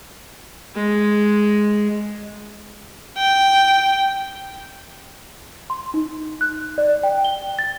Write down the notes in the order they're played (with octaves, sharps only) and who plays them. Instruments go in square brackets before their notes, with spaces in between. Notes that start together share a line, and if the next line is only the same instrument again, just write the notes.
[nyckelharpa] G#3
[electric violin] G5
[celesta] C6
D#4
F#6
D5
G5
G7
A6